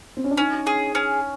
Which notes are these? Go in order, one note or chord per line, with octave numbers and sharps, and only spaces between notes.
C4
C#4
D4
C#4 D#4
G#4
C#4